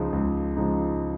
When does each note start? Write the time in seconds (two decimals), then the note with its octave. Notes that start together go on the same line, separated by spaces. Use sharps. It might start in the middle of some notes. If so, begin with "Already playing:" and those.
Already playing: C#2 C#3 F3 G#3 D#4
0.12 C#2
0.57 C#3 F3 G#3 D#4